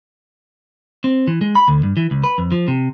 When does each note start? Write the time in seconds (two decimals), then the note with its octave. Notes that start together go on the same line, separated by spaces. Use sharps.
1.04 C4
1.27 E3
1.41 G#3
1.55 B5
1.68 D2
1.83 G2
1.97 E3
2.11 C#2
2.24 B4
2.38 F2
2.52 F3
2.68 C3